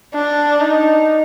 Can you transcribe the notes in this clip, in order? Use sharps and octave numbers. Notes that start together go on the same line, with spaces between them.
D4
D#4